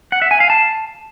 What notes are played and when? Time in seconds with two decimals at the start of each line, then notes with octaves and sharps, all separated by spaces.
0.12 F#5
0.22 E5
0.31 G#5
0.40 F5
0.50 A5